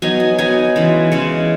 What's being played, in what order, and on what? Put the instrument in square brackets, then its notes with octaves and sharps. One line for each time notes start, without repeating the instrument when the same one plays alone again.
[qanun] F#3 B3 D#4 G#5
G#5
F#3 B3 D#4 G#5
C#3 E3 G#3
C#3 E3 G#3 F#5